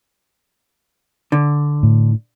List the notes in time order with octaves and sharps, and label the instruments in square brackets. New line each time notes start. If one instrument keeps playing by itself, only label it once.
[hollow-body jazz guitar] D3
[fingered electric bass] A2